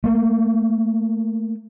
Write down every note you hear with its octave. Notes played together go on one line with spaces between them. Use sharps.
A3 A#3